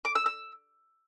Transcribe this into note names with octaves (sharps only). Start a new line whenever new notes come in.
D6
E6
E6